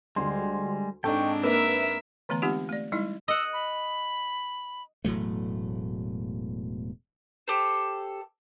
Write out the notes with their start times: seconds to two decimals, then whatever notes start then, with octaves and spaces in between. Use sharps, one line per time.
0.16 D2 G3 G#3 C6
1.04 G#2 C4 D4 D#4 A4 G5 C#6
1.43 A#3 A#4 B4 E5 E6
2.29 D3 E3 A3 B3 A#5
2.42 G#3 C4 D#4 F4 G4 F#5
2.69 A3 D5
2.92 G3 G#3 D#4 E4
3.28 D#5 F#5 E6
3.53 B5
5.05 E1 A2 F#3 A3
7.48 G4 A4 C5